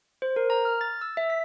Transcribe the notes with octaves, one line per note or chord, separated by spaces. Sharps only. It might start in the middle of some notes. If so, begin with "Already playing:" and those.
C5
A#4
A#5
F6
A6
E6
E5
B6